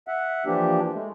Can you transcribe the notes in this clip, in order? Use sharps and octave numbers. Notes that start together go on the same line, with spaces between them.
E5 F#5
E3 F3 A#3 D4 G4
G#3 A3